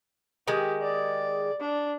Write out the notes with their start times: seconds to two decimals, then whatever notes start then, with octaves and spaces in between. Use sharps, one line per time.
0.48 D#3 G#3 G4
0.82 D5
1.60 D4